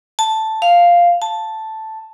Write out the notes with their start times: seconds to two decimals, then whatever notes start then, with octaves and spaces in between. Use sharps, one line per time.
0.19 A5
0.62 F5
1.22 A5